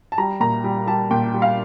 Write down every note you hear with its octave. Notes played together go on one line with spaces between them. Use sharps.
A5
G3 A#5
A#2 A#5
G3
G3 A5
A#2 G5
G3
F5